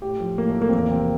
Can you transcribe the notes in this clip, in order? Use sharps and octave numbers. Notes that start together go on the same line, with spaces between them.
A2 G4
F3
A2 A#3
A3
F3
A#3
C4
E2 A#3
C3 F3 C4